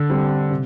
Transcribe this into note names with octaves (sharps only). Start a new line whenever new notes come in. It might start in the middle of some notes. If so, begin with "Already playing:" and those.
Already playing: D3 E6
G3 C4
C3